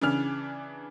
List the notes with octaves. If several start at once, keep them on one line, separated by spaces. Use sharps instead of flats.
C#3 E3 D4 F6